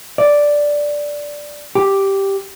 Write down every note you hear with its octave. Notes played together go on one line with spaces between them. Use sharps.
D5
G4